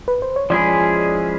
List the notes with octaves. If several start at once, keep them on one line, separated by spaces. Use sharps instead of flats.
B4
C5
C#5
F3 G#3 C#4 E4 G#4 D5